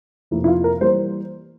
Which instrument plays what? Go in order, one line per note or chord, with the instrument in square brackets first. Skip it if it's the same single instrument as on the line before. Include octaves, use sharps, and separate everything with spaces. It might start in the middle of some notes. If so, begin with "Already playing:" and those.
[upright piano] F2 C3 F3 A#3 E4
E4
F4
A#4
E3 G3 A#3 C5